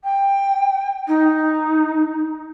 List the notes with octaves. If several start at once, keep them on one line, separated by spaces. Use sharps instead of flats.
G5
D#4